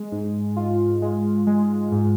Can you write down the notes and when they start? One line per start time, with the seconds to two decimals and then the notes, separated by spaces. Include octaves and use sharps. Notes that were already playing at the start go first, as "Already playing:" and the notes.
Already playing: G#3
0.12 G#2
0.56 F4
1.02 G#3
1.47 G#3
1.92 G#2